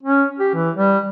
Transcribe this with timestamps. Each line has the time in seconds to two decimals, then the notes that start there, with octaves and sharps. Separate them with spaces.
0.03 C#4
0.39 G4
0.54 E3
0.76 G3